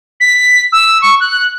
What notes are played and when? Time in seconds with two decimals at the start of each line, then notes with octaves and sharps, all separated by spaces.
0.20 B6
0.72 E6
1.02 C#6
1.20 F#6